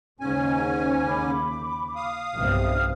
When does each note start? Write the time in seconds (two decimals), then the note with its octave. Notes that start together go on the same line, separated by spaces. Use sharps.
0.20 D#2 G#2 C#3 C#4 G#5
1.06 B5 D6
1.96 F5 D#6
2.37 B1 G2 C3 F6